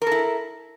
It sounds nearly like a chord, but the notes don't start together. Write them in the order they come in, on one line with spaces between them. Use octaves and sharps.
A#4 A4 E4